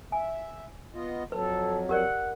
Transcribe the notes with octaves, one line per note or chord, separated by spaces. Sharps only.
E5 G#5
B3 F4 D#5
F2 F#3 A4 B4
G4 A#4 D5 F#5